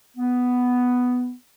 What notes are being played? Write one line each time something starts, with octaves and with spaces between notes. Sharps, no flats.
B3